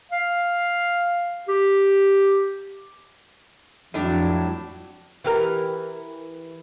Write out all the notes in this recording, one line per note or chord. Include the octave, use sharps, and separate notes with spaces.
F5
G4
F2 A2 F#3 D4
E3 G4 A#4